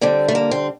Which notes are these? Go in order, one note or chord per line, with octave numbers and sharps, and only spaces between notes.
D3 G3 C4
A3
A#3
C4